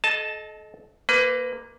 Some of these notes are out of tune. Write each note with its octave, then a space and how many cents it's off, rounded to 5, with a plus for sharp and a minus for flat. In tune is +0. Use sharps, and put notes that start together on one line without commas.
A4 -35 D#5 +0 A5 +0
A#3 +0 B4 +30